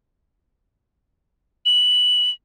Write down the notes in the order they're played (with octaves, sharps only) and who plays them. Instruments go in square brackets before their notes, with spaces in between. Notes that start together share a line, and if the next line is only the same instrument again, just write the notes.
[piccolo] F#7